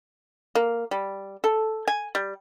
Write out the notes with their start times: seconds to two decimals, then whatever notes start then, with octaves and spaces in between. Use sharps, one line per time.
0.55 A#3
0.91 G3
1.44 A4
1.88 G#5
2.15 G3